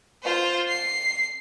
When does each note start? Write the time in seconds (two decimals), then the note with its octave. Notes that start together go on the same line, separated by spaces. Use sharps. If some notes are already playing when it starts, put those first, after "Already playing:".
0.23 F4 C5
0.68 C7